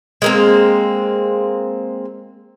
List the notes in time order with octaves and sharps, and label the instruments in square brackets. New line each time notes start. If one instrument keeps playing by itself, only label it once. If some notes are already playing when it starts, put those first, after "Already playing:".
[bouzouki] G#3 A#3 C4